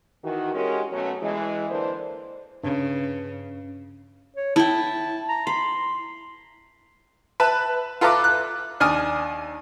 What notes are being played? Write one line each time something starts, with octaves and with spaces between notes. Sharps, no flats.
D#3 E3 F#4
G#3 C#4 F#4 G4 A#4
B2 F#3 A3 B3 C#4
E3 G#3
D3 E3 A#3 D4 C5
G2 C#3
C#5
E4 G5 A5
A#5
B5 C6
B4 E5 A5
F4 A4 B4 E5 A#5 D6
F#6
D#2 D4 G#5 D#6 F6